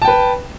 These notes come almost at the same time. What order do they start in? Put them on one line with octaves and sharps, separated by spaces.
A5 G5 B4